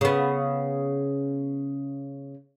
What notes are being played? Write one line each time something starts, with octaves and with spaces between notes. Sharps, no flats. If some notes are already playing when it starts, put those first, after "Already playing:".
C#3 B3